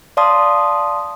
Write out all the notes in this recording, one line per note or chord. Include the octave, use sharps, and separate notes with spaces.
D5 F5 A5 C6 D#6